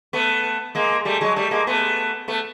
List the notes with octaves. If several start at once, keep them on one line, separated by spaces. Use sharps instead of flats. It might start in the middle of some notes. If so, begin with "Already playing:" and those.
A3 B3
G#3 A#3
G3 A3
F#3 G#3
G3 A3
G#3 A#3
A3 B3
A3 B3